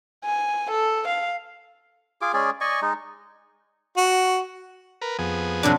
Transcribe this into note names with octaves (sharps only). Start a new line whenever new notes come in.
G#5
A4
F5
F4 G#4 D6
G#3 C#4 G#4 D5
D5 D#5 G#5 C#6
G#3 D#4
F#4
A#4 B4
F2 B3 G#4
C3 F#3 D4